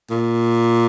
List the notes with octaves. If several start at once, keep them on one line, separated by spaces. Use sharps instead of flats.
A#2